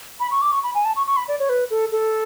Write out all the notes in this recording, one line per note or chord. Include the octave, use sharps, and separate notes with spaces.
B5
C#6
D6
C#6
B5
G#5
A5
C#6
C#6
B5
D5
C#5
B4
A4
A4